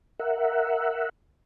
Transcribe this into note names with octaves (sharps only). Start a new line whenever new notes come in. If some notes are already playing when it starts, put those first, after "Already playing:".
A#4 E5 F#5